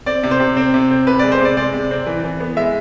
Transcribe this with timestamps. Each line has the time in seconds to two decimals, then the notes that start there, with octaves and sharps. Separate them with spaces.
0.06 C4 D5
0.23 C3
0.31 C5
0.40 C3
0.57 C4
0.74 C3
0.91 C4
1.07 C3 B4
1.19 G#3 D5
1.32 C5
1.40 C3 D5
1.56 G#3 D5
1.73 C3
1.91 C4
2.07 E3
2.24 E3
2.40 B3
2.57 G#3 E5